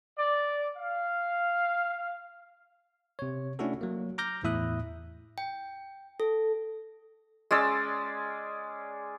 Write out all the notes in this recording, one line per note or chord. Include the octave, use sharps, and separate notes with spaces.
D5
F5
C3 C#5
A3 C#4 D4 E4 F#4 A4
F#3 A#3
A#5 D6 F6 G6 A#6
E2 A2 E4 E5 D#6 F#6
G5
A4
G#3 C#4 D5 E6